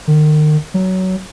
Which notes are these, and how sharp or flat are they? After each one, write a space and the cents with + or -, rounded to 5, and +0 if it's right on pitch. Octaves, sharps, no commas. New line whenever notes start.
D#3 -35
F#3 +15